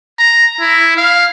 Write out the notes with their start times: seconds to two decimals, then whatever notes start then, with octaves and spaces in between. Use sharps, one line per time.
0.19 A#5
0.60 E4
0.97 F5